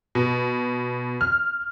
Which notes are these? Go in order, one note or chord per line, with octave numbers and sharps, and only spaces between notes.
B2
F6